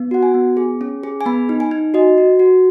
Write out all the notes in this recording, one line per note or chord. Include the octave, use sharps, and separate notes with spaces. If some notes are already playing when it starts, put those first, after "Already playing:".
Already playing: B3
F#4 F#5
G#5
B3
G#4
C#4
G#4
G#5
B3 B5
D#4
G#5
D#4
F#4 D#5
F#4
F#4